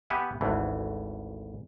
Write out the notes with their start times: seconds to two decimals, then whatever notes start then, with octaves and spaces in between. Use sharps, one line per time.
0.10 B3 G4 B4 E5 F#5 G#5
0.41 G#1 D2 E3